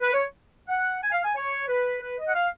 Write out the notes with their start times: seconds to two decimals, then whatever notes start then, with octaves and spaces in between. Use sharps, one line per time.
0.01 B4
0.13 C#5
0.68 F#5
1.02 G#5
1.12 F5
1.23 G#5
1.34 C#5
1.67 B4
2.00 B4
2.17 D#5
2.27 F#5
2.34 F5